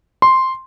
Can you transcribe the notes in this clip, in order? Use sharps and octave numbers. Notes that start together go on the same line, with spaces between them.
C6